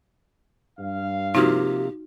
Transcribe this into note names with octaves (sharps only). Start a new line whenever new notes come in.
G2 F5
C3 F3 A#3 D#4 F#4 G4